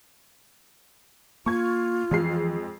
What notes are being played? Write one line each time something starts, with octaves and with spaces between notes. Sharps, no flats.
A#3 F4 C#6 G#6
F2 E3 F3 G#3 C7